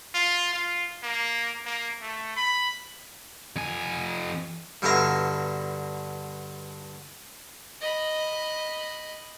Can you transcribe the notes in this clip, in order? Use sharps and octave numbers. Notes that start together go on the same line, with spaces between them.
F4
F4
A#3
A#3
A3
B5
F2 G#5
G2 B2 D3 E4 F5 A#5
D#5 B5